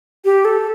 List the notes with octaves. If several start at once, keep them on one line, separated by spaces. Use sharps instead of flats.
G4
A4